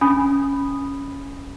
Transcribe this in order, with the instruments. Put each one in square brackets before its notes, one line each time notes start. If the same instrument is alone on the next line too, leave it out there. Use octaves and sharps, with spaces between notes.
[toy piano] C#4 [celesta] G#5 B5 D#6